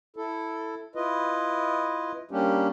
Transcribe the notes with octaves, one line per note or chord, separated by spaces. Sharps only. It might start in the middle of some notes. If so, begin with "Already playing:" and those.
E4 A4
E4 F4 B4 D#5
G3 A#3 C#4 D4 G4